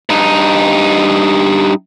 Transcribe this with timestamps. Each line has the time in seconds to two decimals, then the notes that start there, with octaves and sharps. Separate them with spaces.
0.09 G2 D#4